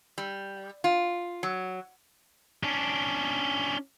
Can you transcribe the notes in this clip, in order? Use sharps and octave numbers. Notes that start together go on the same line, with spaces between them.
G3
F4
F#3
C#4 D4